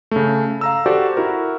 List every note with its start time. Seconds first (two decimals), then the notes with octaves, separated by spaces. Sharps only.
0.11 C#3 A3
0.61 F5 A#5 E6
0.86 F#4 G4 A4 C5 D5
1.17 E4 F#4 A#4